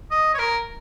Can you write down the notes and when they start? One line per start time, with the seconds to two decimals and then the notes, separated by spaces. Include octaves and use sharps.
0.11 D#5
0.34 C#5
0.39 A#4